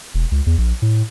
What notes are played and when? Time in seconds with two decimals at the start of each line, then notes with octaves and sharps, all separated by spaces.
0.14 E1
0.31 C#2
0.46 E2
0.58 A#1
0.82 A2